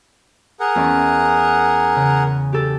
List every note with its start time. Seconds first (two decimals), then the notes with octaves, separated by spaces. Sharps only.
0.60 G#4 A#4 F#5
0.75 E2 C#4 D5
1.95 C#3
2.53 G4 A4